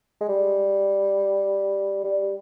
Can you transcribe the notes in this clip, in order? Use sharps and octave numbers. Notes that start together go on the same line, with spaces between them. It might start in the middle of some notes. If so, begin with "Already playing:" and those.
G#3
G3
G3